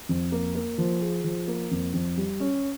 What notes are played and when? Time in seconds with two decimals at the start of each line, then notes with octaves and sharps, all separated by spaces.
0.09 F2
0.32 A#3
0.55 A#3
0.78 F3
1.01 G#4
1.24 F3
1.48 A#3
1.71 F2
1.93 F2
2.17 G3
2.40 C#4